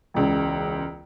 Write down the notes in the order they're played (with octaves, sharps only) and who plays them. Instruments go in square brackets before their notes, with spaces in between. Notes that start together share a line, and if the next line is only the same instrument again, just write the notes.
[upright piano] E1 C#2 C#3